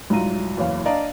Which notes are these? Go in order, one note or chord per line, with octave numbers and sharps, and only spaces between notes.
C2 G#2 F#3 F4 A#5 D#7
F#1 E2 E3 C#5 F5
D4 D5 D#5 F5 A#5